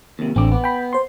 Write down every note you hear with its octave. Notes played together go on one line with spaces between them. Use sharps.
D#2 C3
A1 D3 C4 D6
B3
G5 B5
C5 C6